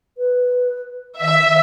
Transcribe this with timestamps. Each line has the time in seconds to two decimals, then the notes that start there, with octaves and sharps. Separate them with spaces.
0.18 B4
1.21 D#3 E5